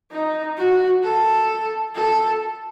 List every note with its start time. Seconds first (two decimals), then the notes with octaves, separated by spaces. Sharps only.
0.11 D#4
0.58 F#4
1.03 A4
1.95 A4